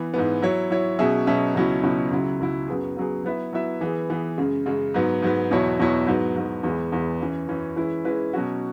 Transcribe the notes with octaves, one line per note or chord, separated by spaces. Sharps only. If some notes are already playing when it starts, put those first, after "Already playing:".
Already playing: E3 B3
G#2 E3 B3
F#3 E4 C#5
F#3 E4 C#5
B2 F#3 C#4 G#4 E5
B2 F#3 C#4 G#4 E5
C#2 B2 F#3 C#4 E4
C#2 B2 F#3 C#4 E4
C#2 C#3 F#3 E4
C#2 C#3 F#3 E4
F#2 F#3 B3 G#4
F#2 F#3 B3 G#4
F#3 B3 E4 B4 E5
F#3 B3 E4 B4 E5
E3 B3 G#4
E3 B3 G#4
F#2 C#3 G#3
F#2 C#3 G#3
G#2 F#3 B3
G#2 F#3 B3
E2 B2 F#3 E4 C#5
E2 B2 F#3 E4 C#5
G#2 F#3 B3
G#2 F#3 B3
E2 E3 G#3
E2 E3 G#3
F#2 E3 C#4
F#2 E3 C#4
E3 G#3 C#4 E4 B4
E3 G#3 C#4 E4 B4
B2 F#3 C#4 F#4